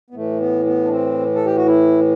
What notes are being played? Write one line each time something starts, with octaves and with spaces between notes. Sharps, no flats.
B3
A2 E3 A3
B3
B3
D4
C4
A4
G4
F#4
E4